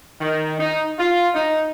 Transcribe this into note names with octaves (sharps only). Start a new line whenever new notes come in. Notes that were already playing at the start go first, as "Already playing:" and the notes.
D#3
D#4
F4
D#4